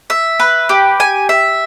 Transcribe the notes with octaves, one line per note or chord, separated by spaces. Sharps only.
E5
B4
G4
G#5
E5